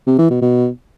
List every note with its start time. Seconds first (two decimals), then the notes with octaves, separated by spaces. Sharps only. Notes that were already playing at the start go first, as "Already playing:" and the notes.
0.07 C3
0.19 E3
0.30 B2
0.42 B2